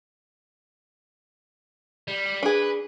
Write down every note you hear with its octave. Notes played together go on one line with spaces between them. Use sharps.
G3
D4 G#4 B4